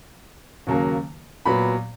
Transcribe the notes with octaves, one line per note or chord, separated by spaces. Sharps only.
D#2 C#3 F#3 A#3
A#2 F#3 B3 B5